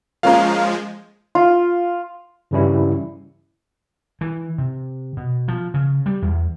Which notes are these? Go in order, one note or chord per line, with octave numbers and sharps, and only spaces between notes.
F3 G#3 A#3 C#4 A#4 F5
F4
G2 C#3 E3 G3 C#4 E4
E3
C3
B2
F3
C#3
G3
E2